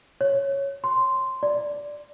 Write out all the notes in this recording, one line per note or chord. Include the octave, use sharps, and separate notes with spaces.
C#5
C6
D5